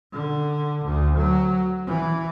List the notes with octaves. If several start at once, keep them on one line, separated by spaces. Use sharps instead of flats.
D3
D2
F#3
E3